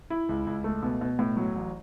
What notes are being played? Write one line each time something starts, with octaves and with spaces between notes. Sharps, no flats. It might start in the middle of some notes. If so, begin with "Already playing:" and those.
E4
C#2
C#2
A3
B2
B2
A2
F#3
A1